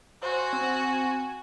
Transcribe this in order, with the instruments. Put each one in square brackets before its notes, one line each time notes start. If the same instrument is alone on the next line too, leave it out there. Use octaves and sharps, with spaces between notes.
[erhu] F#4 [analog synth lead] C5 [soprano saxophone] G#5
[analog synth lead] C4